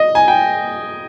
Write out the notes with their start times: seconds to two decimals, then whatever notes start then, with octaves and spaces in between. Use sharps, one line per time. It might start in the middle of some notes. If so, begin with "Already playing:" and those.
Already playing: D#5
0.15 G#5
0.28 G5